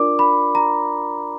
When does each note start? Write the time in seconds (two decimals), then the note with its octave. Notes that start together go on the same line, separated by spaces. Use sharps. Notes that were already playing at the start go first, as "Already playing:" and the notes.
Already playing: D4 F4 A#4 D5 D6
0.19 B5
0.55 A#5